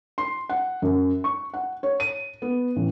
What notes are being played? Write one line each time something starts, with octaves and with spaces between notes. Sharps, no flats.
C6
F#5
F#2
C#6
F#5
C#5
D#7
B3
A1